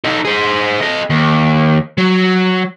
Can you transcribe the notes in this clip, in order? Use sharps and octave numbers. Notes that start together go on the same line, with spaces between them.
D#4 A4
G#4 C5
A4 D#5
D#2
F#3